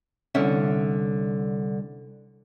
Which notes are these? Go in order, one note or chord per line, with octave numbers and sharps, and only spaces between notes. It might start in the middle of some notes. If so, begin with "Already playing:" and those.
C2 D3 C#4 E5